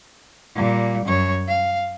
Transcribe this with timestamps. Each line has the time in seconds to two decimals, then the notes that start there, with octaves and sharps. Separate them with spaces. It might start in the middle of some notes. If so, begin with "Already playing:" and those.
0.55 A#2 G3
1.05 F#2 C#5
1.48 F5